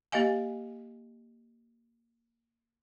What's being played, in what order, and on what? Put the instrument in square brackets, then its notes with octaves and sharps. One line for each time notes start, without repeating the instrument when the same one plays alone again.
[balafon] A#3 G4 D#5 F5 G#5